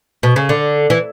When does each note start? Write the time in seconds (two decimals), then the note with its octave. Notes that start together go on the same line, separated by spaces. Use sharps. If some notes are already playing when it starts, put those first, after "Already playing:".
0.23 B2
0.36 C#3
0.49 D3
0.90 E3